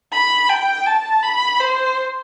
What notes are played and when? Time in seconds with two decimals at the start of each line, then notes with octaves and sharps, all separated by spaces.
0.12 B5
0.49 G5
0.86 A5
1.23 B5
1.60 C5